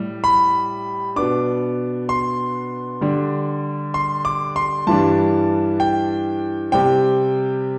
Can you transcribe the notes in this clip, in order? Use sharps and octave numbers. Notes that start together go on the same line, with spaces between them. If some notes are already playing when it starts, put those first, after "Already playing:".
Already playing: A2 G3
B5
B2 B3 D4 D6
C6
D3 G3 D4
C6
D6
C6
G2 E3 G3 D4 A5
G5
C3 G3 C4 G5